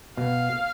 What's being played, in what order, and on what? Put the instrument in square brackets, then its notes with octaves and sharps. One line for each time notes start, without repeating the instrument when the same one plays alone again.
[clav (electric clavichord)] B2 [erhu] F5